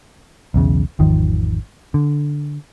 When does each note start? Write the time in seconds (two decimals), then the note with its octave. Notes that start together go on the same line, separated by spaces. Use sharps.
0.54 B1 E2 C#3
0.99 G#1 E2 D#3 F3
1.94 D3